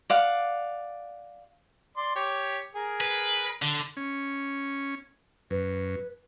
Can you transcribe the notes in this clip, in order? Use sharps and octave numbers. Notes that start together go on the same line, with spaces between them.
D5 F5 F#5
D5 C6
G4 C#5
G#4 A#4
B4
D3
C#4
F#2 B4